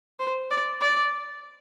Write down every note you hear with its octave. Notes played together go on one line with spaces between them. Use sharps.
C5
D5
D5